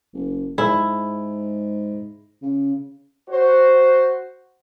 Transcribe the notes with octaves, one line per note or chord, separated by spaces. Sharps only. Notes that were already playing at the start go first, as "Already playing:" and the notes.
F#1
G#2 E4 G#4
C#3
F#4 C5